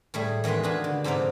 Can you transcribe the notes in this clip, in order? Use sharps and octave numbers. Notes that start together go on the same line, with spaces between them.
A2 G3 A3 G#4
E2 D#3 G#3 B4 C6
D4 F4 F#4 G#4 B4
D3
G#2 C3 F3 D#4 D5